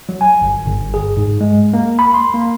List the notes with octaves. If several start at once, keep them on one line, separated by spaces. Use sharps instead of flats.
F#3
G#5
G1
G1
G#4
G#2
G#3
A#3
B5
C6
A#3